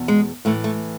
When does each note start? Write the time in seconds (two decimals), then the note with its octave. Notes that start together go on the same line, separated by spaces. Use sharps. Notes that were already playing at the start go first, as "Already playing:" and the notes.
Already playing: E2 B2
0.08 G#3
0.45 A2 E3 A3
0.64 A3